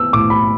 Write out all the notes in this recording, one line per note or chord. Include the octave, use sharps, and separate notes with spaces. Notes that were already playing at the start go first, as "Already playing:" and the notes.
Already playing: B3 E6
A2 D6
B5